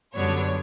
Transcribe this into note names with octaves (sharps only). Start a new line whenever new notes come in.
F#2 D3 G3 B3 D4 C#5